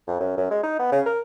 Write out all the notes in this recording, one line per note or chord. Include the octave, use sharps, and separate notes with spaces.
F2
F#2
F#2
G#3
D#4
B3
C#3
A#4